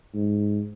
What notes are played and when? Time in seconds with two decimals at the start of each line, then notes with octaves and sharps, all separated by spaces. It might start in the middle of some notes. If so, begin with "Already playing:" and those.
0.15 G#2